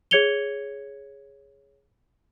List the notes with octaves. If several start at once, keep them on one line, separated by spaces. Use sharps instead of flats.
G#4 C#5 G#6 C#7 F7 G7